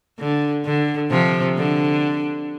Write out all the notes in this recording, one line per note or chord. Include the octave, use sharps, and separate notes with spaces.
D3
D3
C3 F3
D3